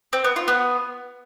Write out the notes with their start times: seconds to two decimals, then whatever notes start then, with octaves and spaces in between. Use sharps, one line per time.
0.13 C4
0.24 B3
0.36 F4
0.48 B3